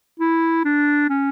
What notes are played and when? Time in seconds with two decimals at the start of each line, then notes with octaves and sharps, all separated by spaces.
0.20 E4
0.65 D4
1.10 C#4